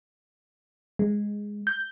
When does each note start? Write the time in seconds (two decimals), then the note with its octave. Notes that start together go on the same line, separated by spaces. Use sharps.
0.99 G#3
1.67 G6